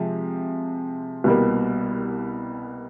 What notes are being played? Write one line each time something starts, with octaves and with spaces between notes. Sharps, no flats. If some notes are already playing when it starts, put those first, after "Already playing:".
Already playing: C3 F3 G#3
C2 B2 G3 A#3